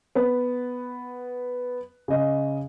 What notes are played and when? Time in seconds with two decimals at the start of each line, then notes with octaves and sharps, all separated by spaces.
0.15 B3 B4
2.08 C#3 D#5